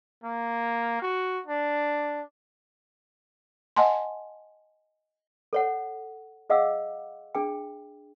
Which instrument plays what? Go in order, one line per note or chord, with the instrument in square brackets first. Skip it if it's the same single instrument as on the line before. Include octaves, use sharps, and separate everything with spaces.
[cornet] A#3
F#4
D4
[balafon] D#5 F#5 G#5 A5 C6
[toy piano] A4 C#5 F#5
G#4 D#5 F5 F#5 D6 E6
D4 G#4 G5